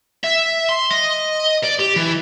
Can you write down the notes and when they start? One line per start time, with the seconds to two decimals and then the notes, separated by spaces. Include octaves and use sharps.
0.24 E5
0.69 C6
0.91 D#5
1.64 D5
1.80 G4
1.96 E3